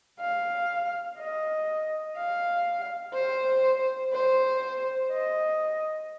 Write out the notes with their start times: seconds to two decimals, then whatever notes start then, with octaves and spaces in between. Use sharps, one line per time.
0.20 F5
1.18 D#5
2.17 F5
3.14 C5
4.13 C5
5.12 D#5